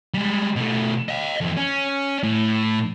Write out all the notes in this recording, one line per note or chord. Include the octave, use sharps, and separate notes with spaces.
G3 G#3
B2 A3
D#5 F5
F2 E3
C#4
A2